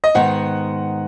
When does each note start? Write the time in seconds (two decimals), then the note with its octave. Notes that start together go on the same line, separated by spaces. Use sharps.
0.04 D#5
0.15 G#2 D#3 G#3 B3 D#4 F#5